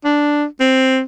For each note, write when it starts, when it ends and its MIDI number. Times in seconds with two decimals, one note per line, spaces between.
0.04 0.45 62
0.60 1.02 60